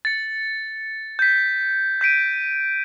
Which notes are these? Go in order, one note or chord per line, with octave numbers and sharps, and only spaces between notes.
A6 C#7
G6 B6
G6 B6 D7 D#7